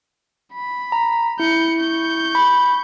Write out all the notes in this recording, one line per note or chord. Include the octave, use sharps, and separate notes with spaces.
B5
A#5
E4 G6 C#7
C#6 G6
B5